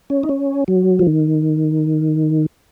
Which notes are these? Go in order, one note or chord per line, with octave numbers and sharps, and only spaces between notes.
C#4
D#4
C#4
F#3
F3
D#3